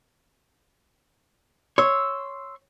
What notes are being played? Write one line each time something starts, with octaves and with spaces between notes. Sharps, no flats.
C#5 C6 E6